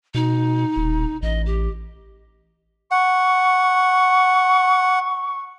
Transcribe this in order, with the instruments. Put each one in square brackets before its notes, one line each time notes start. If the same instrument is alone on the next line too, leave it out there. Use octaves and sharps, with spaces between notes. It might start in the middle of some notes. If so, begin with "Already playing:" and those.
[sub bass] B2 [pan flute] D#4
[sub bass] D#1
[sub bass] A1 [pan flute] D#5
[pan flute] G4
[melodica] F#5 [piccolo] C#6